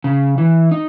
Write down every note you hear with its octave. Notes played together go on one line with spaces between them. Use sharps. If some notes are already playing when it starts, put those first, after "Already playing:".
C#3
E3
D#4